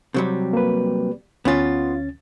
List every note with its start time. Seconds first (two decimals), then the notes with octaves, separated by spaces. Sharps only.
0.14 C3 F#3 G3
0.53 A#3 B4
1.45 D2 B3 C#4 F4 A6